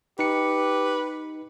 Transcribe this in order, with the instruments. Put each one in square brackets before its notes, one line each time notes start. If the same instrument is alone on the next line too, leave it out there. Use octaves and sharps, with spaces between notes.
[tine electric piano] D#4 C#7 [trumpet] G4 [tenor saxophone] B4